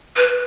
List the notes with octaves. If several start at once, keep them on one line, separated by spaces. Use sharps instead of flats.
B4